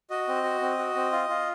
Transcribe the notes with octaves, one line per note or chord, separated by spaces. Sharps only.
F#4 D#5
C4
F#4
C4
F#4
C4
F4
F4